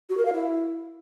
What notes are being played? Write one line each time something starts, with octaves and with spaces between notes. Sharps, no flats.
F#4
A#4
F5
E4